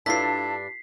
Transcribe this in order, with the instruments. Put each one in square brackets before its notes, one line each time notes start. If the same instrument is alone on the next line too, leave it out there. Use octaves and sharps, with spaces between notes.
[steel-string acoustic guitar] G2 D4 [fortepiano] E4 F4 A4 [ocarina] A5 [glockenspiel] B6 C7